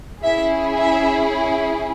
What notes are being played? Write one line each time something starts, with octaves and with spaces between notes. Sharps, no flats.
C#4 E4 G#4 E5
E5